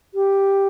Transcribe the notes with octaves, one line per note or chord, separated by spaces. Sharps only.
G4